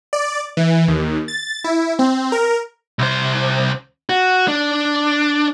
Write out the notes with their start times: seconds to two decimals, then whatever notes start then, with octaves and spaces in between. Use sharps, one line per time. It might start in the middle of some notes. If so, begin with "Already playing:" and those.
0.13 D5
0.57 E3
0.88 D#2
1.28 A6
1.64 E4
1.99 C4
2.32 A#4
2.99 C2 C5
4.09 F#4
4.48 D4